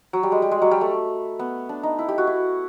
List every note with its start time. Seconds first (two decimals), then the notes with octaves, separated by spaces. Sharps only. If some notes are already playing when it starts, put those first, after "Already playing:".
0.13 F#3
0.23 G3
0.32 G#3
0.42 G3
0.51 G#3
0.62 F#3
0.71 G3
0.81 A3
1.39 B3
1.69 D4
1.83 D#4
1.99 E4
2.09 G4
2.18 F#4
2.27 E4